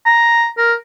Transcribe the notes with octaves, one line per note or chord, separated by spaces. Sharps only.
A#5
A#4